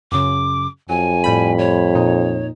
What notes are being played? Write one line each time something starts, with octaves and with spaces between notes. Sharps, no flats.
F#2 C#3 D6
F2 F#3 G#5
A2 G3 B5
C#5
A#2 D#4